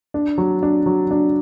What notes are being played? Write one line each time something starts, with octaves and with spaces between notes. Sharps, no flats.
D4
F#3
D4
F#3
D4